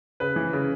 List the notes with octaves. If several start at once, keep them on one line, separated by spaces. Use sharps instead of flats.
C#3 B4
E3
C#3